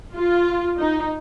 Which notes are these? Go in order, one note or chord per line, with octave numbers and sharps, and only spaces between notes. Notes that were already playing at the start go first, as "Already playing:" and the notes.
F4
D#4